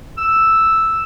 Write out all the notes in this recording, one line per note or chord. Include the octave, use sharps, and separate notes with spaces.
E6